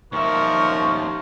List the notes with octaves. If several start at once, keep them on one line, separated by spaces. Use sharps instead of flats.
D#2 F3 A#4 E5 C#6